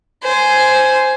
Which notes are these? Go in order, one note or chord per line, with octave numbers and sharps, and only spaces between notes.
C5 G#5